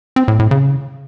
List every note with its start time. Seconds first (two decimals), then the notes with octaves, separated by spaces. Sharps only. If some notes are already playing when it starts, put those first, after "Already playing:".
0.16 C4
0.28 A2
0.39 A2
0.51 C#3